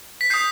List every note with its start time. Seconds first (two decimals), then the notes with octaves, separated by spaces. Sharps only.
0.21 B6
0.30 D#6 G6 C7